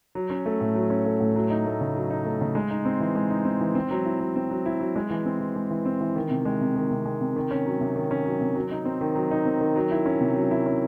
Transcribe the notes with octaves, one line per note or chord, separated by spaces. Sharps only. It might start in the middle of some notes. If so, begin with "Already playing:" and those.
F#3
C#4
A3
A2
F#3
C#4
A3
A2
F#3
D#4
A3
C#3
F#3
D#4
A3
C#3
G#3
D#4
C4
E3
G#3
D#4
C4
E3
C4
F#3
E4
F#3
C4
F#3
E4
F#3
G#3
E3
C4
E3
G#3
E3
C4
E3
D#3
C3
G#3
C3
D#3
C3
G#3
C3
D#3
C#4
F#3
C3
D#3
C#4
F#3
C3
F#3
D#4
C4
D#3
F#3
D#4
C4
D#3
F#3
E4
C#4
C3
F#3
E4
C#4